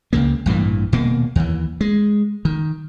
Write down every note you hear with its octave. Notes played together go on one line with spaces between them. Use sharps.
C#2 C#3 A#3
A1 G2 A#2 E3
D#1 B2 A#3
D#2 E3
G#3
D#3